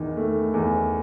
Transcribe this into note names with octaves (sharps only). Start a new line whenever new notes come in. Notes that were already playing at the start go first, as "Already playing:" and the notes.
Already playing: E2 D#3
A3
E2